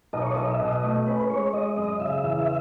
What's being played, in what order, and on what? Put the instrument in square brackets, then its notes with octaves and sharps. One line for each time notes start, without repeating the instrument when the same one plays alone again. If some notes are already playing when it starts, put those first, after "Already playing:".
[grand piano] B1 [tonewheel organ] D#5
[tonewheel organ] C#5
D#5
[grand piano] B1
[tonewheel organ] E5
[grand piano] B2 [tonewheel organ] D#5
[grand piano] A3
[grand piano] C#4 [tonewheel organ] B4
[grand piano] G#3 [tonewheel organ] C#5
[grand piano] G#3 [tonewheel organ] D#5
[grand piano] F#2 [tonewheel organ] D#5
[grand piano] C#3 [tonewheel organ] E5
[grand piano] E2